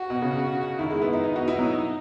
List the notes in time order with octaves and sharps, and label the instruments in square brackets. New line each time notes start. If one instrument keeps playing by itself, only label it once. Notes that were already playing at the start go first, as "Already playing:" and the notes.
Already playing: [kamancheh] F#4
[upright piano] B2
C#3
[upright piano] D#3 [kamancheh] E4
[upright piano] G#3
B3
D#4
[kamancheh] D#4
[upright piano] F#4
E4
F#3